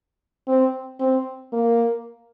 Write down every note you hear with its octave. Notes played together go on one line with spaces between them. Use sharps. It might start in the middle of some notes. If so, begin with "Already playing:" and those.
C4
C4
A#3